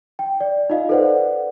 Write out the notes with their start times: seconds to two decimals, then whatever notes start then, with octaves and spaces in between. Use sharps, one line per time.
0.19 G5
0.40 D5
0.70 D#4 F4 D#5 F5
0.89 A4 B4 C5 D5 F#5